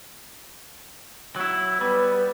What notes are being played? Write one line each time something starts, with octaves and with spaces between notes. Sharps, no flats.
F#3 E4
G3 B3